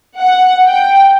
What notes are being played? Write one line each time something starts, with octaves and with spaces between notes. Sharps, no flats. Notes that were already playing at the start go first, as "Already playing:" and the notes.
F#5
G5